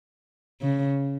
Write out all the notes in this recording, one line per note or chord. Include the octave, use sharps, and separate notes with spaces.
C#3